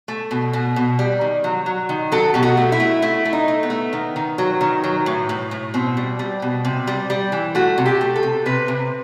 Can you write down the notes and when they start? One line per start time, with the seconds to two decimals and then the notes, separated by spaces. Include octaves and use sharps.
0.08 A3
0.31 B2
0.53 B2
0.76 B2
0.99 G3
1.21 D#3
1.44 F#3
1.66 F#3
1.89 D#3
2.12 F#3 A4
2.34 B2 G4
2.43 F#4
2.57 A3
2.72 E4
2.80 A3
3.02 A3 E4
3.25 A3
3.33 D#4
3.48 A3
3.63 B3
3.70 A3
3.93 D#3
4.16 D#3
4.38 F#3
4.61 D#3
4.84 F#3
5.06 A2
5.29 A2
5.51 A2
5.74 B2 C4
5.97 G3
6.19 G3
6.42 B2
6.65 C3
6.87 G3
7.10 G3
7.32 E3
7.55 A3 F#4
7.78 C3
7.86 G4
8.01 A3
8.16 A4
8.23 C3
8.46 C3 B4
8.68 C3